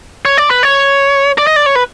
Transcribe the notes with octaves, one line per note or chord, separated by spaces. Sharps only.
C#5
D5
B4
C#5
D5
D#5
D5
C#5
B4